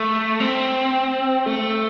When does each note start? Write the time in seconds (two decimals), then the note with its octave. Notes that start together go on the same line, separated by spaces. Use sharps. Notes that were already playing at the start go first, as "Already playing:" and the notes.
Already playing: A3
0.40 C4
1.46 A3